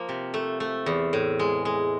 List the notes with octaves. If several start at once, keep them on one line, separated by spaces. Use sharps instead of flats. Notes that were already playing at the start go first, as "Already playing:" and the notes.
Already playing: F3 A#3
C3
A3
A3
E2
A2
G#3
G#3